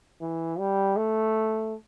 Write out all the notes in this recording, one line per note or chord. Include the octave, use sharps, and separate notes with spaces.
E3
G3
A3